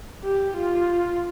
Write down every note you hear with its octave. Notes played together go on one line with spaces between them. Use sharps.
G4
F4